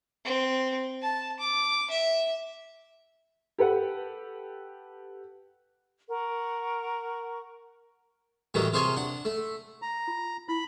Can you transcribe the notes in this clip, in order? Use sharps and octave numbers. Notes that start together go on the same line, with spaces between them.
C4
A5
D6
E5
G4 A4 B4 F#5
A#4 F#5 C#6
A2 D#3 E3 F#3 G3
C3 F4 G#4 C5 C#5 G#5
D4 F#5
A3
A#5
F4
E4 B5